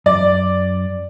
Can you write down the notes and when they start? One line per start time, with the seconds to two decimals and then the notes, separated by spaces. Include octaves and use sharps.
0.06 F#2 D5